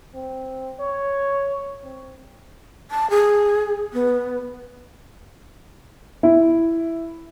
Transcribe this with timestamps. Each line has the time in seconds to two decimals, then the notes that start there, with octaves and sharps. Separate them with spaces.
0.15 C4
0.80 C#5
1.84 C4
2.91 A5
3.10 G#4
3.93 B3
6.23 E4